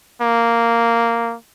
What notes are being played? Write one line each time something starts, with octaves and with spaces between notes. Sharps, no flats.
A#3